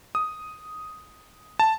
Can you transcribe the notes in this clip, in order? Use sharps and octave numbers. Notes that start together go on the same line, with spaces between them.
D#6
A5